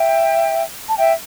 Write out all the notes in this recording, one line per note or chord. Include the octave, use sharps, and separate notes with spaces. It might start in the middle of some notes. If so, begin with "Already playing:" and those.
Already playing: E5 G5
A5
E5 G5